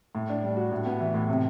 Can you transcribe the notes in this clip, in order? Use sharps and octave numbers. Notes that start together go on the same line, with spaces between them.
A2
D4
G3
F#4
A2
B3
E3
A2
C3